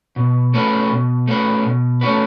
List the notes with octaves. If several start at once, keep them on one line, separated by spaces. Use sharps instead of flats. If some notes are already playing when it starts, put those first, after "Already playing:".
B2
A3 C#4 F#4 B4
B2
A3 C#4 F#4 B4
B2
A3 C#4 F#4 B4